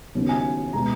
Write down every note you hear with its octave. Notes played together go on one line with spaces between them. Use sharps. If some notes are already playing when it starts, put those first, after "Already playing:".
D#2 C#3 F#3 B3
G#5
B2 G#3 B3 A#5